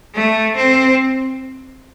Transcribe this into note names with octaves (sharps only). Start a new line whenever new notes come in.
A3
C4